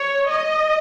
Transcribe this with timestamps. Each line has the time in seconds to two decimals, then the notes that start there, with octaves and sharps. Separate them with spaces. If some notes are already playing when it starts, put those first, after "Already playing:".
Already playing: C#5
0.29 D#5